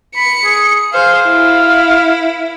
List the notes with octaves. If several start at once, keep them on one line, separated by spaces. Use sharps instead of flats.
B5 C#7
G#4
G#4 C5 F5
E4